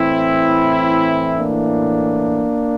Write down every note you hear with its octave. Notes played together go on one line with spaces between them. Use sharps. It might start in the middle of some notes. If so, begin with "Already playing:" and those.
Already playing: A2 E3 C4 E4
A#3 D4